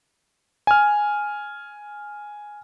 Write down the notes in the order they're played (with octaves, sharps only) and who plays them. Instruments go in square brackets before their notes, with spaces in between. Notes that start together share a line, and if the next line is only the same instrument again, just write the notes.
[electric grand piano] G#5 F6